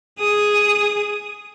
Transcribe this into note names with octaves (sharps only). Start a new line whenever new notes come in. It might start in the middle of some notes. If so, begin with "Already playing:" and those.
G#4 D#6